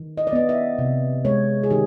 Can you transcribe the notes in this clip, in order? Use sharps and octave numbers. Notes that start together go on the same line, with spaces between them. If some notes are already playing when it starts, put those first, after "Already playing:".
Already playing: D#3
D#5
D5
B3 D#5
E5
C3
G#3 C#5
G#4
D#3 G4